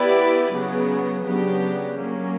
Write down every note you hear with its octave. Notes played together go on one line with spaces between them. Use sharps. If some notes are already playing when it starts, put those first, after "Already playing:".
Already playing: B3 E4 G4 B4 D5
C#3 F#3 B3
C#3 F#3 B3 D4 G4
F#3 A#3 C#4